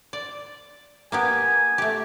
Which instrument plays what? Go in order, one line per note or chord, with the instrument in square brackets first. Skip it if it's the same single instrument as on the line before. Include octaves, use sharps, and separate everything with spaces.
[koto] D5
[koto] A#3 B3 G4 [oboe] G#5
[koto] A3 G4